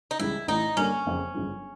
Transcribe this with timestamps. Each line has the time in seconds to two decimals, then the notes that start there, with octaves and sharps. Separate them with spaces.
0.11 D#4
0.19 C#2 C#3 E3 G3 E4
0.48 A1 A2 E3 D#4
0.77 G2 D3 G3 A#3 C#4 D4
1.06 F#1 F2 C#3
1.34 G1 F#2 C#3 F3